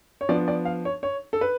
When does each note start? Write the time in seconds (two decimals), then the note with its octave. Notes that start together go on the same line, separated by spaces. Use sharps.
0.21 C#5
0.29 F3 B3 D4 D5
0.48 D5
0.65 F5
0.85 C#5
1.03 C#5
1.33 A4
1.41 B4